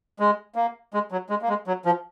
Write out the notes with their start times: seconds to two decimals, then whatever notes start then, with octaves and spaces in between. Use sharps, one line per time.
0.20 G#3
0.55 A#3
0.94 G#3
1.12 F#3
1.30 G#3
1.42 A#3
1.49 G#3
1.67 F#3
1.85 F3